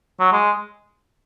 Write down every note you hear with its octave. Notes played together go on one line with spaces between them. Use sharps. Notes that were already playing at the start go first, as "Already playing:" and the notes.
F#3
G#3